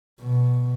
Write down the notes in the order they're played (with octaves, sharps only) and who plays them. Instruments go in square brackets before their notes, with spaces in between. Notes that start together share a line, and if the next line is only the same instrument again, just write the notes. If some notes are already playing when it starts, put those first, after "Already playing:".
[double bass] B2